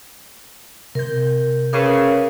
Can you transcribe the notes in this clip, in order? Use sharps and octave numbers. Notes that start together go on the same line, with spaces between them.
C3 A#4 G6
C#3 A#4 B4 C#6 D6 E6